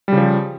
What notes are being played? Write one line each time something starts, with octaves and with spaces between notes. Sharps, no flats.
C#3 F3 G3